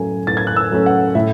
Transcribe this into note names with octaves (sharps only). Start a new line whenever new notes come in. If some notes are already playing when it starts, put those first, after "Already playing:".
Already playing: A2 F#3 A3 C#4 G#5
A2 A6
G#6
F#6
E6
F#3 A3 C#4
F#5
A2 E5